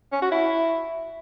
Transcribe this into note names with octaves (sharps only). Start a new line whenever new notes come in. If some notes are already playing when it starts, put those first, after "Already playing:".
C#4
F#4
E4